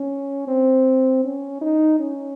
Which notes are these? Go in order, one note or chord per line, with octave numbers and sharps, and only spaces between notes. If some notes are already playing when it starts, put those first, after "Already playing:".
Already playing: C#4
C4
C#4
D#4
C#4